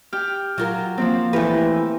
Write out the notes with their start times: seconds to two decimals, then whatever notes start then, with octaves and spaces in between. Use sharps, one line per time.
0.13 G4 G5 F6
0.58 F#3 F4 A#4
0.98 F3 A#3 C4
1.33 E3 A3 G4 A#4 B4